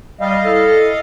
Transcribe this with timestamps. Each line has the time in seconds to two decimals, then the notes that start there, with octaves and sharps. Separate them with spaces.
0.21 G3 D#5 F5
0.45 E4 A4